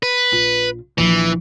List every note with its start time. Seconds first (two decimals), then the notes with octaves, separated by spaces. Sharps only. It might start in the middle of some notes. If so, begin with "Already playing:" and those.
0.03 B4
0.32 A#1 F4
0.98 A#1 E3 F3